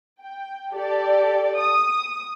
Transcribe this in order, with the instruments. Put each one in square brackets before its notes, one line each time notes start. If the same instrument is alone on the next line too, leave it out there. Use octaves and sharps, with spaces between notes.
[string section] G5
G4 A4 D5
D#6